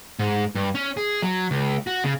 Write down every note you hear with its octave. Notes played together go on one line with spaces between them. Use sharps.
G#2
G2
C#4
G#4
F#3
C#2
F#4
C#3